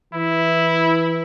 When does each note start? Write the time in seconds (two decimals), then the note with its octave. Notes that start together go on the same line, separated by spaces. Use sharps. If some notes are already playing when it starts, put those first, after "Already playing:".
0.14 E3 E4